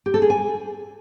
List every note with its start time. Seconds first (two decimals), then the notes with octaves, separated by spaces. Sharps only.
0.06 G4
0.14 A4
0.22 G#4
0.30 G#5